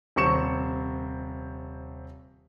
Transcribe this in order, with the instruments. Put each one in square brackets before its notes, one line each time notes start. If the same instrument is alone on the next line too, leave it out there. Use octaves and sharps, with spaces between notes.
[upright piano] D#1 C3 C4 C#6 C#7 E7